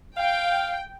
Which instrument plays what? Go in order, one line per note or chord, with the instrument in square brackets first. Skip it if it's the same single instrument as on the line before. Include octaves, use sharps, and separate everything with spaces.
[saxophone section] F5 [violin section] G5